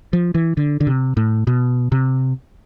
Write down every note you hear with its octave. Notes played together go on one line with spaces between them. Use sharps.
F3
E3
D3
D3
C3
A2
B2
C3